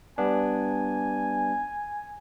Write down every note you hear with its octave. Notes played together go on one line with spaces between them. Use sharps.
G3 B3 D4 G#5